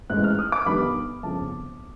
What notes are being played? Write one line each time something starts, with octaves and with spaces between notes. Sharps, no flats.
A1 G#2 E3 G#3 F#6
F6
D#6
D6
G1 G2 D#3 G3 B5
G1 F2 C#3 A5